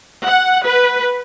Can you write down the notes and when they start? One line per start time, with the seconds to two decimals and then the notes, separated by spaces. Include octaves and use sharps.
0.25 F#5
0.64 B4